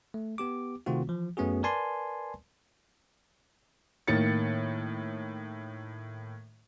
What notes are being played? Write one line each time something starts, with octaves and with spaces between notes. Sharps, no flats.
A3
B3 G4 D6
C3 D#3 A3 C4 F4 F#4
E3 F3
F#2 A3 B3 C#4 F#4 G#4
A#4 B4 D5 G#5 A5 C6
A2 D#3 A#3 A6 C#7